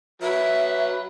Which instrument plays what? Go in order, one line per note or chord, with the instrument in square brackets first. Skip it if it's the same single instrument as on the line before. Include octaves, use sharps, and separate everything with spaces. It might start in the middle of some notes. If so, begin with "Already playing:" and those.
[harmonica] F#3 B4 [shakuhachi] E5